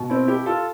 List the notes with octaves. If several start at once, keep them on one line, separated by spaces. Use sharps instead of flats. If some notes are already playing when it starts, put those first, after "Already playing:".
Already playing: B2
C4 E4
E4 G4
F4 A4